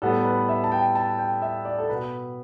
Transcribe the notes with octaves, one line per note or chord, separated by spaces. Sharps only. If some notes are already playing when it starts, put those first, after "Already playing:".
A2 G3 B3 A4
B4
E5
A5
G5
A5
G5
E5
D5
A4
B2 B3 B4